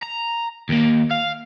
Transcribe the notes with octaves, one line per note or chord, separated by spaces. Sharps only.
A#5
D#2 A#3
F5